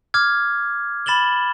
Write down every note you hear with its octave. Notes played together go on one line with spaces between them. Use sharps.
D6 F6 G#6
B5 A6 E7 F#7 G7